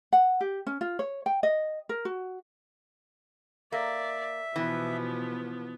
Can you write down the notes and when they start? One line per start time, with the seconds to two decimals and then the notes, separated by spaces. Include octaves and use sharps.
0.13 F#5
0.41 G4
0.67 C#4
0.81 F4
0.99 C#5
1.26 G5
1.43 D#5
1.89 A#4
2.05 F#4
3.72 A#3 D5 E5
4.56 B2 E3 F3 B3